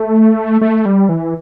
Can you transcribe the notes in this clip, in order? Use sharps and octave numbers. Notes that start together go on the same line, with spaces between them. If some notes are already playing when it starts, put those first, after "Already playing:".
Already playing: A3
A3
G3
E3